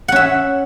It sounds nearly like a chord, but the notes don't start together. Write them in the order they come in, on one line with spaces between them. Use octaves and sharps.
F#5 C#4 E5